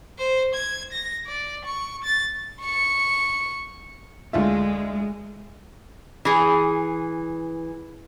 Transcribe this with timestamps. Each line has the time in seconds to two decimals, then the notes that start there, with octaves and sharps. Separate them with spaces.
0.18 C5
0.55 G#6
0.92 A#6
1.27 D5
1.65 C#6
2.04 A6
2.61 C#6 C#7
4.33 D2 G#3 F4 E5
6.25 E3 G#4